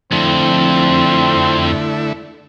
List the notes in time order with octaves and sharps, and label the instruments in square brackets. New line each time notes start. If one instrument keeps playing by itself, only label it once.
[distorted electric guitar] F2 [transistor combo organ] D3 A3 E4 [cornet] C4